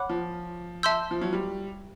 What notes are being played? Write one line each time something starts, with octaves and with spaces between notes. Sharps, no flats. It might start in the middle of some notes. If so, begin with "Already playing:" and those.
Already playing: C#5 F#5 B5 D6 F#6
F3
E5 A5 C6 E6 G6
F3
F#3
G3